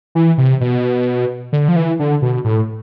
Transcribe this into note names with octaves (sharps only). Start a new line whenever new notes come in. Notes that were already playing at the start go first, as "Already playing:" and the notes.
E3
C3
B2
D3
F3
E3
D3
B2
A2